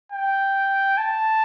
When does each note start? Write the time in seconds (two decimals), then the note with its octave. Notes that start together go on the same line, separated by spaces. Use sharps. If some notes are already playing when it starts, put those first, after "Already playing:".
0.12 G5
0.98 A5